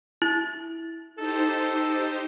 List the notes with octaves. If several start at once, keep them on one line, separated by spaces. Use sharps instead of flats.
E4
D#4 G4 A4 C5